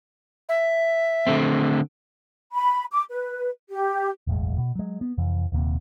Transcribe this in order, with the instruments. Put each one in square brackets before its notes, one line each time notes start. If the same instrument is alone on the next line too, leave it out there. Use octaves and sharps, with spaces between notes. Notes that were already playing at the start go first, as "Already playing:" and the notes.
[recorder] E5
[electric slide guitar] D3 A3 C4
[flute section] B5
D6
B4
G4
[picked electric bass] E1 A1 F#2 G#3
B2
F#3 G#3
B3
F2 C3 E3
D#1 D#2 C3 A#3